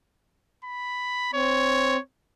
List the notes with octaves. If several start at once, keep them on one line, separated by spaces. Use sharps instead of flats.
B5
C4 C#5